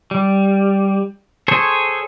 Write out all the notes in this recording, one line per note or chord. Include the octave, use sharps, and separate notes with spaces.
G3
G#4 A4 C5 C#5